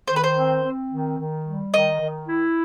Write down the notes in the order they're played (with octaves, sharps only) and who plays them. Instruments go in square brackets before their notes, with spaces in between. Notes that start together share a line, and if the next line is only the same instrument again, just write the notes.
[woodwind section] D#3 [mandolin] C5
[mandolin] B4
C5
[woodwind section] C4
C4
D#3
D#3
G3
[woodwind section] D#3 [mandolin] D#5
[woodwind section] D#3
E4